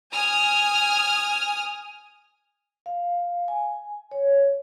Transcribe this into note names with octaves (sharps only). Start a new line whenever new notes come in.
G#5 D#6 F6
F5
G#5
C#5